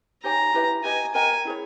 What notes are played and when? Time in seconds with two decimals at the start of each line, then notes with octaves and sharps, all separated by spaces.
0.23 D#4 G4 C#5 G#5 A#5
0.54 E4 G4 B4 E5
0.84 G4 B4 D#5 G#5 A#5
1.14 A#4 D#5 G5 G#5 A#5
1.45 E4 G#4 C#5